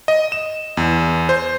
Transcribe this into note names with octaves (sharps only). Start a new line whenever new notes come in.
D#5
E7
E2
C5